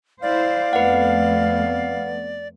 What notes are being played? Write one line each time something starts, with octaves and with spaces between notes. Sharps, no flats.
E4 C5 D5 F5
F2 A3 B3 B4 F#5